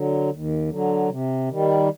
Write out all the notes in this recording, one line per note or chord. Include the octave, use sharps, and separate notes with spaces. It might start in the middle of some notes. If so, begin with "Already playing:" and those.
Already playing: D3 F#3
D#2
D3 F#3
C3
D#3 G3